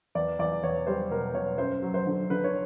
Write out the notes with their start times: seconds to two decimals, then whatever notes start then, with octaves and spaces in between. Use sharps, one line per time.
0.15 E2 D5
0.39 E2 D5
0.63 E2 C#5
0.87 G3 C5
1.11 B2 A#4
1.34 B2 C#5
1.58 F#2 C5
1.82 F#3
1.94 C5
2.07 D3
2.30 D3 B4
2.44 C#5